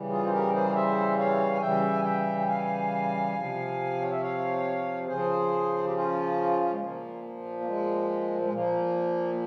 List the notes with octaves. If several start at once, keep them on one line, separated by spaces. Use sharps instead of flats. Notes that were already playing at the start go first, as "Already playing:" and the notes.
Already playing: C#3 E3 G3
F4 G#4
C5
G4 A#4
G#4 C5
C#5
C5 E5
C#5 F5
G#5
C#3 E3 G3 E5 G5
G#5
E5 G5
G5
F5 G#5
C3 F3
C#5
E5
C#5 F5
C#3 F3 G#4 C5
G4
C#4 F4
G#3
A#2 F3 A#3
A#3
G#3
G#3
A#2 F3 A#3